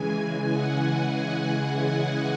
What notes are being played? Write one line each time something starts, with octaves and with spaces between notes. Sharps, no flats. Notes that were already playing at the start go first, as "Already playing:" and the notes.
Already playing: C#3 E3 G#3 G#5
F#5